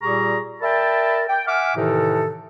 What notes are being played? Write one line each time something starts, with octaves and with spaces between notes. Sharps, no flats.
A#2 G3 G4 G#4 A#5 C#6
A#4 D5 E5 G5 A5 B5
G5
E5 F#5 G#5 D6 F6
A2 C3 D#3 E3 D#4 A4